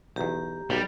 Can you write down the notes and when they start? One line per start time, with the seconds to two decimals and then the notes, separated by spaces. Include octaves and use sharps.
0.16 B1 E2 G4 A#5
0.70 B1 G3